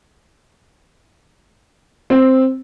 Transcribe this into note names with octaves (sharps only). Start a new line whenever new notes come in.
C4